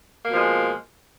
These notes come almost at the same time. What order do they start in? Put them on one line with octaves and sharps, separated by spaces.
A#3 B2 F3 G#3